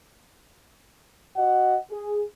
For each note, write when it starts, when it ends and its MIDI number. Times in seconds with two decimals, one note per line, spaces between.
1.36 1.76 66
1.36 1.76 75
1.36 1.76 78
1.91 2.22 68